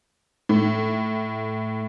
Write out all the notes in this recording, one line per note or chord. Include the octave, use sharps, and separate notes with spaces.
A2